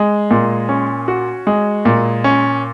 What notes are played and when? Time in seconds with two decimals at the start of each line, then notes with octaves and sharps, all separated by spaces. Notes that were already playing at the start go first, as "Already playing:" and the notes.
Already playing: G#3
0.31 A#2
0.69 C#4
1.08 F#4
1.47 G#3
1.85 A#2
2.24 C#4